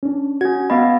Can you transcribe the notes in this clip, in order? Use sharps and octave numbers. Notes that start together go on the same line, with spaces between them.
C#4 D4
C#4 F#4 G#6
B3 D#5 F5 B5